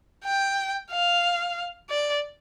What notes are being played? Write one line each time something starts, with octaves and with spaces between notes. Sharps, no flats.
G5
F5
D5